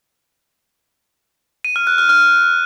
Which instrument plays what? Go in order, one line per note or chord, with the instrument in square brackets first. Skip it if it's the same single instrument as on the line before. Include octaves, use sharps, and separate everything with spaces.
[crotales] D#7
F6
F#6
F6
F6